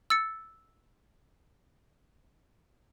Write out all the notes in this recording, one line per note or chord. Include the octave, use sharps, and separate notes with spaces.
E6 A6 C#7